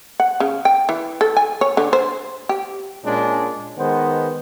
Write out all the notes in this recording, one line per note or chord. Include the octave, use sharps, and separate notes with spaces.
F#5
C#3
G5
E3
A4
G#5
C#5
D3
C5
G4
A#2 G#3 C#4 D4
D#3 G#3 B3 C5